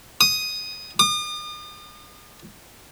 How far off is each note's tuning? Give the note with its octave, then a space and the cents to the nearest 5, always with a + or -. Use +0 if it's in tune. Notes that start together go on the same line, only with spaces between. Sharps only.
D#6 +5
D#6 -45